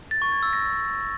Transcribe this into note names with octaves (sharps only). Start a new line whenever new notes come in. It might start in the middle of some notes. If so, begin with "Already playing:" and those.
A6
C#6
G#6
E6
A#6